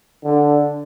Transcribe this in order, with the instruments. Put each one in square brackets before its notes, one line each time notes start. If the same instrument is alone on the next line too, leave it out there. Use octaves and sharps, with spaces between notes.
[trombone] D3